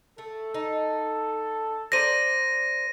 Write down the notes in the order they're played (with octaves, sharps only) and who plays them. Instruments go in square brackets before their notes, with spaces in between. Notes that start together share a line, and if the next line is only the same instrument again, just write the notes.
[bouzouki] A3 [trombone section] A4
[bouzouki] D#4
[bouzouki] A#4 C5 D5 [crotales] A#6 D#7